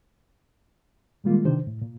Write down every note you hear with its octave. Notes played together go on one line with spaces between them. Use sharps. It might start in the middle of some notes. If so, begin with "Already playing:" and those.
A#2 D#3 G3 G#3 A#3 F4
C3 D#3 E3 D4 G4 C5
A2
A#2